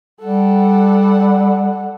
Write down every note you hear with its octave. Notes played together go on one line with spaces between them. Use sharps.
G3 A4 F#5